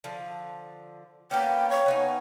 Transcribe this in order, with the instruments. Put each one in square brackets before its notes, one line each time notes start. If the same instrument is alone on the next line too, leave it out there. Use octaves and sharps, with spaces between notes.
[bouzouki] D3 F3
[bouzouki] A#3 B3 C#4 [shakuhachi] G5
[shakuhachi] C#5
[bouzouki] B3 D#4 G#5